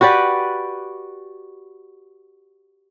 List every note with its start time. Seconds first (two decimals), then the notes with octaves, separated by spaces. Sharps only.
0.01 F#4 G4 B4 D5